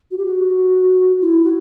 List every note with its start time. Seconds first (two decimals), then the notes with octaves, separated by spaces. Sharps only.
0.11 F#4
0.18 G4
0.26 F#4
1.21 E4
1.44 F#4